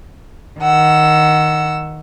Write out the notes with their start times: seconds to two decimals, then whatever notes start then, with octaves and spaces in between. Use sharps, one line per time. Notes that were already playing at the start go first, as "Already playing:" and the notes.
0.60 D#3 F#5 E6